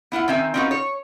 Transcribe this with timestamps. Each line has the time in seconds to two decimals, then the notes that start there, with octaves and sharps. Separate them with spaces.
0.12 B3 E4 F4 F#5
0.28 D#3 C4 E5 G#5
0.54 C4 C#4 D#4 F4 F#4 B4
0.71 C#5